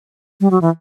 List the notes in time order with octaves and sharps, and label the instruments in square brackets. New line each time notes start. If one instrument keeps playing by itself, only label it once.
[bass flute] G3
F#3
E3